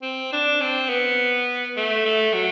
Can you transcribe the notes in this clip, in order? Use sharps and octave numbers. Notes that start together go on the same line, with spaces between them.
C4
D4
C4
B3
A3
A3
F#3